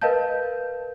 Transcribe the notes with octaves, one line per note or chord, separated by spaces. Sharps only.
A#4 B4 D#5 F5 A5 G6